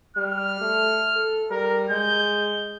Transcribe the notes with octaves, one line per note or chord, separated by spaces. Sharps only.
G3 F6
A3
A4
G3 A#4
G#3 G6